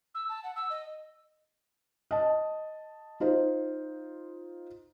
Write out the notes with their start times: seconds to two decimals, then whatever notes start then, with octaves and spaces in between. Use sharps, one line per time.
0.15 E6
0.29 A5
0.44 F#5
0.56 E6
0.70 D#5
2.11 D#5 A5
3.20 D#4 F4 C5